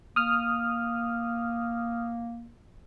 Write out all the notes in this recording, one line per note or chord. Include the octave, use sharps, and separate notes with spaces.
A#3 D#6 F6